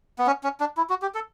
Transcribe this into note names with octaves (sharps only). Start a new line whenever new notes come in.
B3
C#4
C#4
D4
E4
F#4
G4
A4